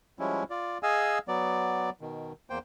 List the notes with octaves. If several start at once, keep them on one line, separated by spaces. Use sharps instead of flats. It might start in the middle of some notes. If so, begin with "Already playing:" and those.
F3 G3 G#3 C#4 E4
F4 D5
G#4 D#5 F5 G#5 E6
F#3 B3 D5
B2 D#3
E2 A#3 C5 G5